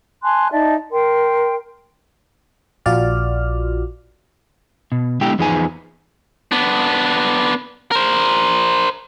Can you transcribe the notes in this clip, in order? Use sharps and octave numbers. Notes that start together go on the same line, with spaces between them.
G#5 A5 C6 F#6
D#4 D5 E5 A5
A#4 G5 C6
A#1 F4 F#4 D5 F6
B2
D3 G#3 B3 E4 G4 G5
E2 F3 D#4 G#4 B4 G#5
B3 D4
A#4 C5